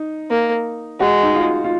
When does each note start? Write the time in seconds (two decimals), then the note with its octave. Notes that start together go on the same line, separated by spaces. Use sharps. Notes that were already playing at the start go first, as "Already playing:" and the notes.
Already playing: D#4
0.30 A#3
1.00 G#3 F#4
1.23 D#4
1.35 F4
1.64 F4